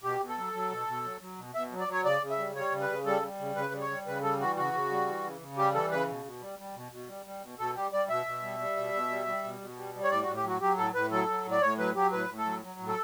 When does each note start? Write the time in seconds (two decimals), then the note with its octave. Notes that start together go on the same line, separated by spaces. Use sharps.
0.04 B2 G4
0.20 B2
0.29 A4
0.38 F#3
0.53 F#3
0.71 B2
0.87 B2
1.04 F#3
1.21 F#3
1.38 B2
1.55 B2 E5
1.72 F#3
1.80 D5
1.88 F#3 C#5
2.05 C#3 D5
2.21 C#3
2.31 E5
2.39 G3
2.56 G3 C#5
2.72 C#3
2.81 B4
2.90 C#3
3.06 G3 A4
3.22 G3
3.39 C#3
3.56 C#3 B4
3.73 G3
3.81 C#5
3.90 G3
4.06 C#3 B4
4.23 G3 A4
4.40 E3 F#4
4.57 C#3 F#4
4.73 C#3
4.91 G3
5.07 E3
5.24 C#3
5.41 C#3
5.57 G3 G4
5.74 E3 A4
5.91 C#3 B4
6.08 B2
6.25 B2
6.41 G3
6.59 G3
6.75 B2
6.92 B2
7.08 G3
7.26 G3
7.42 B2
7.59 B2 A4
7.75 G3 G4
7.92 G3 D5
8.09 B2 E5
8.26 B2
8.42 G3
8.59 G3
8.77 B2
8.93 B2
9.10 G3
9.27 G3
9.44 B2
9.61 B2
9.77 G3
9.95 G3
10.04 C#5
10.11 A2 D5
10.23 F#4
10.27 A2
10.36 G4
10.44 F#3 F#4
10.61 F#3 G4
10.78 A2 A4
10.94 A2 B4
11.11 F#3 A4
11.28 F#3
11.45 A2
11.51 D5
11.62 A2 C#5
11.78 F#3 B4
11.95 F#3 G4
12.12 A2 B4
12.29 A2
12.38 A4
12.46 F#3
12.63 F#3
12.80 A2
12.88 A4